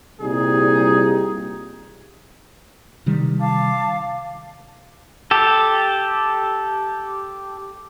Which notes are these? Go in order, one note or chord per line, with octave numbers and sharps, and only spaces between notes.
C2 A#2 G3 D#4 G#4
C3 D#3 G3
F5 A5 D6
G4 A4